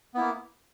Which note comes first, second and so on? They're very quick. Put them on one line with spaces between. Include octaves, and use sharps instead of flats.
B3 E4 A#3